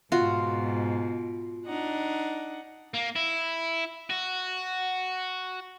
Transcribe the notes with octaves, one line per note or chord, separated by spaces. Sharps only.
G#2 B2 F4 F#4
D4 D#4 F#5
A#3
E4
F#4